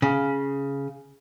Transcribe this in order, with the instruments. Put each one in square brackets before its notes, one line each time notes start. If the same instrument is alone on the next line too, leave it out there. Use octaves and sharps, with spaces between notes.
[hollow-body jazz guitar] C#3